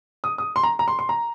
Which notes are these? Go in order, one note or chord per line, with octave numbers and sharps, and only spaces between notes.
D#6
D#6
C6
A#5
A#5
C6
C6
A#5